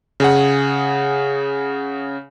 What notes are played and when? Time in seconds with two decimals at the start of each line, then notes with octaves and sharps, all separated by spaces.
0.20 C#3 G#4 F#5